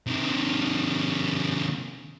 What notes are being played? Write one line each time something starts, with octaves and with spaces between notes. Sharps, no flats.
C3 D#3